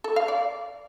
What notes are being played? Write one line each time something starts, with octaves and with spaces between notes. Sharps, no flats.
A4
F5
D5